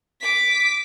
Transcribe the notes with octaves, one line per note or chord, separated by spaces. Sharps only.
D6 B6